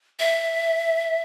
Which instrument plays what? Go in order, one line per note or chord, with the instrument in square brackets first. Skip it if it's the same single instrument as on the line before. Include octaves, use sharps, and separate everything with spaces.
[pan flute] E5